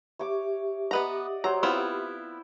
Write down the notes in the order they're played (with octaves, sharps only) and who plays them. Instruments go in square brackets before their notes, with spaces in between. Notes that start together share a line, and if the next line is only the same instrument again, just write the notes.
[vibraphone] G4 E5 [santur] C#5 D6
[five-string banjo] B3 B4 A#5 [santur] D5 D#5 F#5
[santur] F#3 C5 [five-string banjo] A#5
[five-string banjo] B3 C4 F4 [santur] E4